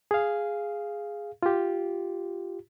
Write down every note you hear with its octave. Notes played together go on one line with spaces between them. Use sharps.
G#4 F5
F4 G4